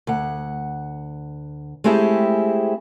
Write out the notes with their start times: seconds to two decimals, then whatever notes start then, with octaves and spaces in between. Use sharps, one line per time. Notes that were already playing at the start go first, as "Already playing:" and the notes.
0.07 D2 F#5
1.84 G#3 A3 C4 E4 G4 G#4